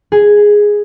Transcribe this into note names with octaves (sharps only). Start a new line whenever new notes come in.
G#4